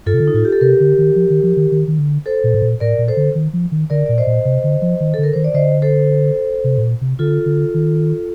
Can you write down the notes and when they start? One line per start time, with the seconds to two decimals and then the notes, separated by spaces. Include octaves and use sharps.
0.06 G2 F4 A4
0.14 C3
0.20 D3
0.28 D#4
0.34 A2 F4
0.45 G4
0.52 A4
0.61 C3 G4 A#4
0.80 D3
0.98 D#3
1.16 F3
1.30 D#3
1.43 F3
1.57 D#3
1.72 D#3
1.88 D#3
1.99 D3
2.26 A4 C5
2.44 A#2
2.54 A2
2.62 A#2
2.80 A2 A#4 D5
2.98 A#2
3.08 A4 C5
3.17 D3
3.35 D#3
3.54 F3
3.72 D#3
3.90 D3 A#4 D5
4.06 A#2 D5
4.18 C5 D#5
4.27 A#2
4.45 C3
4.64 D3
4.82 F3
5.01 D#3
5.14 D3 A4
5.23 A#4
5.33 D#3 C5
5.44 D5
5.54 D3 C5 D#5
5.82 A4 C5
6.64 C3
6.78 A2
6.82 A#2
7.01 C3
7.19 D3 F4 A4
7.46 D3
7.74 D#3